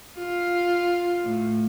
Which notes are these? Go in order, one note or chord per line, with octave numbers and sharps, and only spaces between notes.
F4
A2